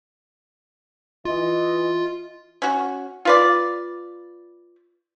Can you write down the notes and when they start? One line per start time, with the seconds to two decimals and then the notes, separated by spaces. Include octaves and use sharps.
1.25 E3 F4 D#5
2.62 C#4 F#4
3.25 F4 B4 D5